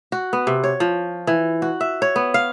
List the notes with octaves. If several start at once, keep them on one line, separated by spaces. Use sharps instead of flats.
F#4
B3
C3
C#5
F3
E3
F#4
E5
C#5
B3
F5